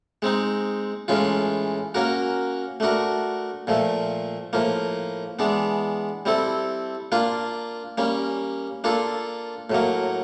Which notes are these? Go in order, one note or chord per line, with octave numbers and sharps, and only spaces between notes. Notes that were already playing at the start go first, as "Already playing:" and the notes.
G#3 C4 D#4
A2 E3 G#3 C#4 F4
A#3 C#4 F#4 A#4
A3 D4 F#4 A#4
A#2 F3 A3
A2 F3 A#3
E3 G#3 B3 D4
G3 C4 E4 A4
A#3 D4 F4
G3 A#3 C#4
A#3 D4 F4 A4
A2 F#3 A#3